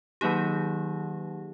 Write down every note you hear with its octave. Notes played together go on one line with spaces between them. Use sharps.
D#3 F#3 A#3 D#4 G4